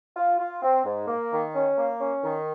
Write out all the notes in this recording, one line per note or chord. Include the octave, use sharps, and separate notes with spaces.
F4
F4
C4
G#2
A#3
D#3
C#4
A#3
C#4
D#3